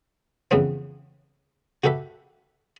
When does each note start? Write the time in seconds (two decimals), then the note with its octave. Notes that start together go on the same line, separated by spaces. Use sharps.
0.51 F2 C#3 E3 B3 C4
1.84 F#4 G4 A4 B4 E5